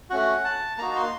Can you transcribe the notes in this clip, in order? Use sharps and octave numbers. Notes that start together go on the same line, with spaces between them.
A3 C#4 F#4 F#5
A5
A#3 D#4 F#4 A#5
C6